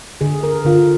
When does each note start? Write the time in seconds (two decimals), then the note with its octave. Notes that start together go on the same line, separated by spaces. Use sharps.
0.21 D3 G#4
0.43 A#4
0.65 D3 F4